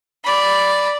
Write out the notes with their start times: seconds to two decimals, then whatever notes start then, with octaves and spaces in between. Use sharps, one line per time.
0.24 D5 B5